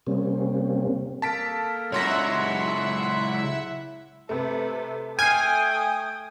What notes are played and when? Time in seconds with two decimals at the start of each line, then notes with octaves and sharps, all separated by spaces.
0.07 C3 G3 A#3 C4 C#4
1.22 A#3 A4 A#4 A5 B6 D7
1.92 C#2 F#3 E4 C#5 E5 F#5 C6 A#6
4.29 C3 A3 A4 B4
5.19 A3 G5 G#5 D#6 F6 C7